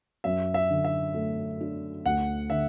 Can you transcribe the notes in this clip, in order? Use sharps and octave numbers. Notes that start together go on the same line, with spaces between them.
F#2 E5
E5
D3
E5
A3
D4
D2 F#5
D3 E5